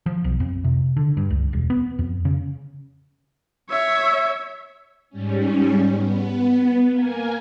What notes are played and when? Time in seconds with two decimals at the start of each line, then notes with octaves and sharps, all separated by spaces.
0.06 F3
0.24 B1
0.40 F2
0.64 C3
0.97 D3
1.17 G2
1.30 C#2
1.53 E1
1.70 B3
1.99 F2
2.25 C#3
3.70 C#5 E5
5.10 G#2 G3 C#4
5.91 B3
6.89 A#3 A#4 G#5